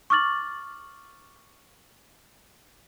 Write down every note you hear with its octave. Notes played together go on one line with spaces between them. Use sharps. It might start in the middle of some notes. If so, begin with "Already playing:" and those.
C#6 D6 F6 A6 F#7